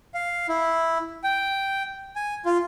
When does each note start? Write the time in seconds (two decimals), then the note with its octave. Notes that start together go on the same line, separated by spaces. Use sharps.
0.14 F5
0.49 E4
1.24 G5
2.16 G#5
2.45 F4